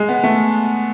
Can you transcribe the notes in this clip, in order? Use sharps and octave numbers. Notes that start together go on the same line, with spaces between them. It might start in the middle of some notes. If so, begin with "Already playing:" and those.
Already playing: G#3
B3
A3